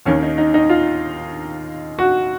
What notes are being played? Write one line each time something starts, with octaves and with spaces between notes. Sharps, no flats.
D#2 D#3 C#4
D#4
D#4
D#4
F4
F#4